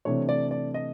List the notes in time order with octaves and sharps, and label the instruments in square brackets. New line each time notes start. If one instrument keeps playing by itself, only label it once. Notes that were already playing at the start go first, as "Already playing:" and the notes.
[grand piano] C3 E3 A3 D4 [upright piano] C#5
[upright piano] D5
D5
D#5